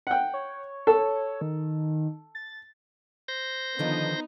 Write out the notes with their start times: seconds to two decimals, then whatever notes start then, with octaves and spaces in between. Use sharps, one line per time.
0.07 F#5 G5
0.33 C#5
0.87 A4
1.41 D#3
2.35 A6
3.28 C5 G6 A#6
3.79 D3 D#3 F3 B3 D#4